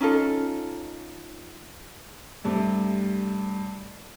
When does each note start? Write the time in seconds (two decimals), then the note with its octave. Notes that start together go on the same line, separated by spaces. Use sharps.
0.01 C#4 D#4 F4 A4
2.44 G2 C3 A3